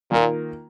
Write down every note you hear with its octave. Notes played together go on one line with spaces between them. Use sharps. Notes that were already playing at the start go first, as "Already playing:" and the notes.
A#2 D#3 A#3 F4 A#4